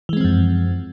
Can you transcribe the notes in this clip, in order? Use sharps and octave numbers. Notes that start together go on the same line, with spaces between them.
F#2 E3 F3 G#3 C4